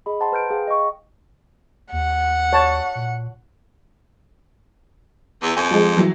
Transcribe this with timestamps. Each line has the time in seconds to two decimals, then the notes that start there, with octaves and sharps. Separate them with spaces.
0.06 G#4 D#5 B5
0.20 C5 F#5 A5 A#5 C6
0.32 B4 F6 G6 D7
0.50 G#4 F5 G5
0.67 D#5 C#6
1.92 D#2 F#5
2.53 C#5 A5
2.95 A#2
5.42 E2
5.57 F2 G#5
5.71 F3 G#3
5.97 E3 F#3